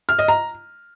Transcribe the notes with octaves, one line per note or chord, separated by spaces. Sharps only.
F6
D#5
A#5